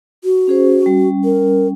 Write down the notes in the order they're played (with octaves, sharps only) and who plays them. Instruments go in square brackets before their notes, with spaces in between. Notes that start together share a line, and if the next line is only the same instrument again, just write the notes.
[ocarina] F#4
[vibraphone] C#4 G#4 C5
G3 C#4
[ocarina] A#4